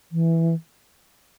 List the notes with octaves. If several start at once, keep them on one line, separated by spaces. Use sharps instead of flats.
E3